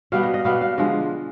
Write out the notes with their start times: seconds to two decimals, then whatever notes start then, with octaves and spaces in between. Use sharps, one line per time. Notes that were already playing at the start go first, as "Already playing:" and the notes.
0.12 B2 G3 B3 F5
0.23 D#5
0.34 D#5
0.45 B2 G3 B3 F5
0.61 F5
0.78 D3 F3 G#3 D#5